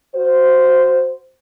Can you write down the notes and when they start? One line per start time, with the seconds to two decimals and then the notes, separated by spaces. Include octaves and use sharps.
0.15 F#4 C5